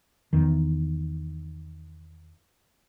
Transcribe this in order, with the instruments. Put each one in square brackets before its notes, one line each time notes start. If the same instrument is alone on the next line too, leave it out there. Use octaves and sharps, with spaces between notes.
[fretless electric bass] E2 D#3